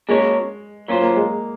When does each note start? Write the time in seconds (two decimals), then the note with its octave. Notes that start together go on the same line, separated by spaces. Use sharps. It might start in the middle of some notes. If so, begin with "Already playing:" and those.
0.08 G#3 A#3 C#4 F#4 A#4 C#5
0.88 F#3 A#3 C#4 F4 C5
1.02 A#3
1.16 G#3